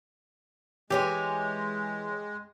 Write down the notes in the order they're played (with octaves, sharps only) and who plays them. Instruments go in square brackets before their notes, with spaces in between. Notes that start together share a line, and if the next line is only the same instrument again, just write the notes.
[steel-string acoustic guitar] E3 C#5 G#5 [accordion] G#3 [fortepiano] G4